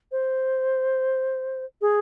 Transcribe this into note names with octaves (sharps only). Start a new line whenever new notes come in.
C5
G#4